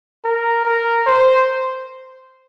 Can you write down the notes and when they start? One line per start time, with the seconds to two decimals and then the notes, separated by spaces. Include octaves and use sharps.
0.24 A#4
0.65 A#4
1.06 C5